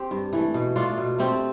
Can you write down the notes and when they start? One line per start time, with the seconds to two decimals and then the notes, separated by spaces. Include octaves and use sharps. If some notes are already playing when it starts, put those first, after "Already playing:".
Already playing: C4 G4
0.11 G2
0.33 E3 A3
0.54 B2
0.76 A3 D4 F4
0.98 B2
1.18 A3 C4 G4